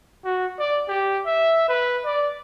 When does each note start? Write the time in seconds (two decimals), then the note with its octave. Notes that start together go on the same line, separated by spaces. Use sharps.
0.25 F#4
0.59 D5
0.88 G4
1.26 E5
1.68 B4
2.05 D5